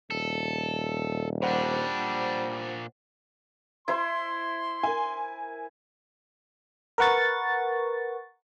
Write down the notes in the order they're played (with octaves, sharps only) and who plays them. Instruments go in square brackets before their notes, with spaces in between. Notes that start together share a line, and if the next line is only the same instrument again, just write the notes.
[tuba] D#1 [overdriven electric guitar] A4
[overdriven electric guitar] A#2 D4 [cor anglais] G3 [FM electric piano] C5 F#5
[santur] E4 C5 [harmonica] C6
[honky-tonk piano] A#4 G#5
[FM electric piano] A#4 B4 F#5 C#6 A6